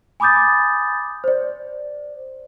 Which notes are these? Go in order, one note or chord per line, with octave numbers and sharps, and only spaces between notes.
G#5 B5 D6 D#6 G6 A6
C5 D5